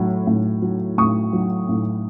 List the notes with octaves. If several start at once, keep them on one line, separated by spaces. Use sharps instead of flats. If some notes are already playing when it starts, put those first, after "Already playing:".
Already playing: A2 F#3
A2
F#3
A2 C#6 D#6
F#3
A2